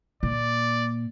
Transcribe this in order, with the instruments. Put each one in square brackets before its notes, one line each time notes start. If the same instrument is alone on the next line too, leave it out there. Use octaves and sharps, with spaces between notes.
[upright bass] A#2 [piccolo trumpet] D5